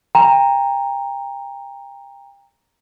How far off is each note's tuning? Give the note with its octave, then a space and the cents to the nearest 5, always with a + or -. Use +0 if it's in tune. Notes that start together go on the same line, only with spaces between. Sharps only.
G5 +30 A#5 +0